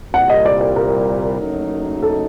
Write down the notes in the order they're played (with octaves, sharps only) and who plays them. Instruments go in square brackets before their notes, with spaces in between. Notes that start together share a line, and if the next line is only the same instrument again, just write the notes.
[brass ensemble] C2 A#2 G3 [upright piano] F#5
[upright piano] D#5
D5
D5
A#4
[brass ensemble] F#1 F#2 F#3 A3 D#4
[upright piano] A4